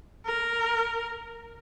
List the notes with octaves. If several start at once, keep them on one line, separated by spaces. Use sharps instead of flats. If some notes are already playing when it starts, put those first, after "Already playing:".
A#4